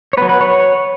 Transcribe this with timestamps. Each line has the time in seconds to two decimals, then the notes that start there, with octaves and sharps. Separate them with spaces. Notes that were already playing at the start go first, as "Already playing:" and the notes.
0.13 C#5
0.17 F#3 B3 B4
0.29 B4
0.41 C#5